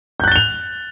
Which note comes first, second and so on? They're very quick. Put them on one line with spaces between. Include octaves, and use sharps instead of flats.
G6 F#6 A6 G7 F7